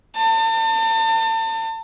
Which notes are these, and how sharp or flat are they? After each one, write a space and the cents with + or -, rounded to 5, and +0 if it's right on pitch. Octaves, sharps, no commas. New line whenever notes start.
A5 +35